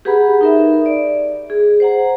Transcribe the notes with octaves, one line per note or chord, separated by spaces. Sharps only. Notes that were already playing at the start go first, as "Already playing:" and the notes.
G4 G#4 B4 F#5 A#5 B5
D#4 A#4 E5
D5
G#4
C5 F#5 A#5